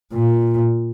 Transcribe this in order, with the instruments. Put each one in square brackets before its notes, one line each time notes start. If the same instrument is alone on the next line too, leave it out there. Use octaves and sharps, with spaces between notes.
[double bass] A#2